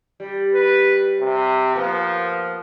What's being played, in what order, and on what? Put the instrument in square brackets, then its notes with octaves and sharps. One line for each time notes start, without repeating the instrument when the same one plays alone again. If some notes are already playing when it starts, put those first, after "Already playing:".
[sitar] G3
[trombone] B4
C3
[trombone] F3 [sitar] A#3 B3